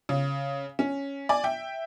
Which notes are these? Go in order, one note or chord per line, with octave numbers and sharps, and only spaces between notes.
C#3
C#4
D5 G#5
E5 G5